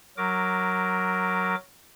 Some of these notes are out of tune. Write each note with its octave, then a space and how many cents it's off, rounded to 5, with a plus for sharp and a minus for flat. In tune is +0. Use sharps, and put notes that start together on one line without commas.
F#3 +0 A#4 +0 D6 +0